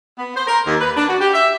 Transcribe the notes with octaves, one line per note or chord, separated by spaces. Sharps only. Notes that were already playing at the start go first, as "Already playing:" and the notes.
B3
C5
A#4
D#2
B4
D4
F#4
G4
E5